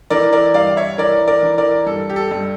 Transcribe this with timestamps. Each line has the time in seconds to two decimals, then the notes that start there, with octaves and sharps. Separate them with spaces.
0.10 E3 A#4 D5
0.33 A#4 D5
0.54 G2 D5 F5
0.77 C#5 E5
0.98 E3 A#4 D5
1.28 A#4 D5
1.43 E3
1.58 A#4 D5
1.86 G2 A4
2.10 G4
2.16 A4
2.31 G2